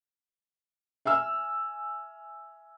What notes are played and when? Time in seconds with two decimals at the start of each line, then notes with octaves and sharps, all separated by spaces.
1.05 E5 G#5 E6 F6